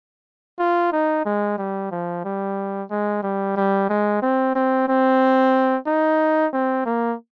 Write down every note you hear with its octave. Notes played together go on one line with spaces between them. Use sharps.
F4
D#4
G#3
G3
F3
G3
G#3
G3
G3
G#3
C4
C4
C4
D#4
C4
A#3